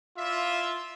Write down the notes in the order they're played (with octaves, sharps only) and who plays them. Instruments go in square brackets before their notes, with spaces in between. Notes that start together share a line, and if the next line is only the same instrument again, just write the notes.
[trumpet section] E4 D5 E5 [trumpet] F4